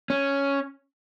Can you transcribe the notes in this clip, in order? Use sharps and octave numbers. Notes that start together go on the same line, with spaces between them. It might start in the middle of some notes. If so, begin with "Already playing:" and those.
C#4